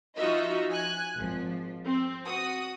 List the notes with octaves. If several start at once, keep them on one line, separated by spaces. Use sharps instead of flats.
F3 D#4 F4 F#4 D#5 E5
G#5 F#6
G#1 F3
C4
F#4 D#6